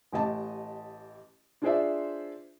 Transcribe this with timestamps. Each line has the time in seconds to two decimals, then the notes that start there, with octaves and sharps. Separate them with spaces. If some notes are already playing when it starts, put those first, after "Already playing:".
0.12 A1 G4 D#5 A5
1.62 D4 F4 G#4 C5 D5 E5